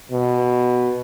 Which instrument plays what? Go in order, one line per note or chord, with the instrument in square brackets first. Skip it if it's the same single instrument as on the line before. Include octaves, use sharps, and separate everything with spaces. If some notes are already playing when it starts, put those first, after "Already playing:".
[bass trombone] B2